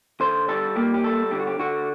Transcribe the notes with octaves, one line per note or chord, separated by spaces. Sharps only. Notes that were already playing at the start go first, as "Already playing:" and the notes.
D3 C5
G3 A4
A#3 G4
G4
G3 A4
D3 G4
F#4
G4
D3 F#4